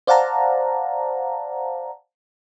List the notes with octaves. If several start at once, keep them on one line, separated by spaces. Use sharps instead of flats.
C5 D5 F5 F#5 A5 A#5